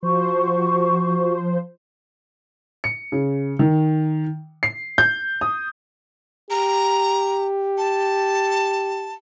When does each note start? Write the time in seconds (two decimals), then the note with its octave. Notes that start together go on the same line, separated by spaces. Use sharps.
0.03 F3 F#4 C5 C#6
2.84 C#7
3.12 C#3
3.59 D#3
4.63 C7
4.98 G6
5.41 D#6
6.50 G4 A#5
7.78 A5